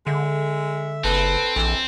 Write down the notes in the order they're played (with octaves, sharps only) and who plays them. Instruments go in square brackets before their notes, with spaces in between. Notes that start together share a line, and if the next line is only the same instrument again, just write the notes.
[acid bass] D3 [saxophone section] G#3 E5
[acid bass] F#1 [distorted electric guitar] C4 [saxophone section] A4 B4
[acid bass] A#1 [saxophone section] E3 A4